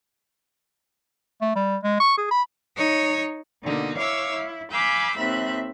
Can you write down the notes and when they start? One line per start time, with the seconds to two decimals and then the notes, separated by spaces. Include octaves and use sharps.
1.41 A3
1.56 G3
1.84 G#3
2.00 C#6
2.18 G#4
2.31 B5
2.77 D#4 C#5
3.64 B2 D3 A#3 D#4
3.97 E4 C#5 F5 D6 E6
4.31 E4
4.71 F5 G#5 B5 D6 E6 G6
5.18 D#2 C4 E5 B5 F#6